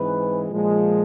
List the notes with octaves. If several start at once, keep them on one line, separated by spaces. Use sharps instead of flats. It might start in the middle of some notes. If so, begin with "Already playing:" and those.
Already playing: G#2 E3 G#3 C4 B4
A#2 F3 G#3